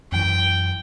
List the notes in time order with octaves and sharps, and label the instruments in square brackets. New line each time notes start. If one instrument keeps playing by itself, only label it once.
[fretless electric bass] F#2 E3 [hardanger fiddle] G5